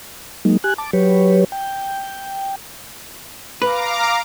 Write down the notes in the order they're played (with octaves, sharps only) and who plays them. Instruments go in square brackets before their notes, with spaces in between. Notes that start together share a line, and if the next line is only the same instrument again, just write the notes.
[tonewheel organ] F#3 G#3 A#3 D#4
G4 G#5 F#6
A5 D6
F#3 G4 B4 C#5
G5
[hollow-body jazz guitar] B4 [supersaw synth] F5 A#5 D6